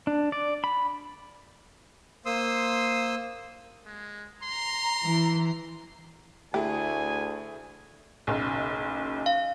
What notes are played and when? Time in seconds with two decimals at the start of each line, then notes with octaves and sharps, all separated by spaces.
0.07 D4
0.32 D5
0.64 B5
2.26 A#3 C5 C6 D#6 E6
3.86 G#3
4.43 A#5 C6
5.04 E3
6.54 D2 A3 E4 G4 G#4 G#5
8.27 F#1 B1
9.26 F5